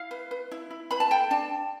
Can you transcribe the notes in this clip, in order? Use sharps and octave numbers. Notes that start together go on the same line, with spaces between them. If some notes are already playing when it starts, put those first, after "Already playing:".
Already playing: E4 F5
B4
B4
E4
E4
B4 B5
A5
A4 G5
D4 A5